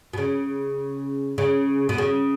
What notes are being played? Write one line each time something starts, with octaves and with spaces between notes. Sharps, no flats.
B2
C#3
C#3
B2
C#3